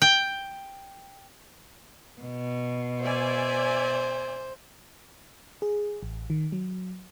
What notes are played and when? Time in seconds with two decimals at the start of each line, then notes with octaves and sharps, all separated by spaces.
0.02 G5
2.21 B2
3.03 C5 D5 E5 G#5
5.62 G#4
6.03 A1
6.30 D#3
6.52 F#3